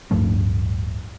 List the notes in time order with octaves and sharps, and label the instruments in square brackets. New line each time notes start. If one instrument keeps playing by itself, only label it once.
[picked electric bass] D1 G2 F3 A3